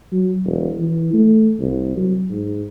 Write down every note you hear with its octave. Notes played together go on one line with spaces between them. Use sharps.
F#3
E1
E3
A3
C2
F#3
G#2